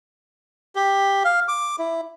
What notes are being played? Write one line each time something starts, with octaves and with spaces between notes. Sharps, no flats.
G4
F5
D6
E4